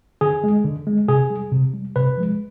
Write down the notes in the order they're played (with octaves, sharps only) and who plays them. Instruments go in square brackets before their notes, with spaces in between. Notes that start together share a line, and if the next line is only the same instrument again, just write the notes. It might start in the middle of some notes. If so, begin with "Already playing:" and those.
[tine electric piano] D3 G#4
G#3
D3
G#3
C3 G#4
G3
C3
G3
C3 B4
F3 G#3